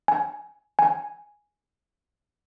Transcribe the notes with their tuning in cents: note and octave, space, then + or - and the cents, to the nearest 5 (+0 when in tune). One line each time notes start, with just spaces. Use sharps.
G#5 +10
G#5 +0